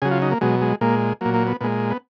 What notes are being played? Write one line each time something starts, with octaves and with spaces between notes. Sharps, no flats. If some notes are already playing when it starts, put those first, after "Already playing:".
C#3 F#3 G#4
F4
D#4
A#3
B2 F#3 G#3
G#3
A#2 G#3 A#3
A#2 F#3 A#3
A#3
B3
A#2 G#3 B3
B3